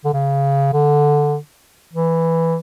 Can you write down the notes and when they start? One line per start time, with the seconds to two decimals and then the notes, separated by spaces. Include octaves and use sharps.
0.05 D3
0.13 C#3
0.73 D3
1.93 E3